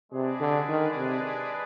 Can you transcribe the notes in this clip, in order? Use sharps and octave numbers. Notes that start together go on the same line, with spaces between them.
C3 G#3 D4 G#4 B4 D5
D3
D#3
C3